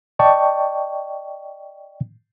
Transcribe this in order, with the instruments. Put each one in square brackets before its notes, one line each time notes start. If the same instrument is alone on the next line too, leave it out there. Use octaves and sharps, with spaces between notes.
[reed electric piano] D5 D#5 G5 A5 C#6